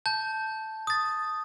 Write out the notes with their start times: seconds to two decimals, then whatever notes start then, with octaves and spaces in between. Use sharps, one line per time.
0.06 A5 G6
0.87 D#6 A6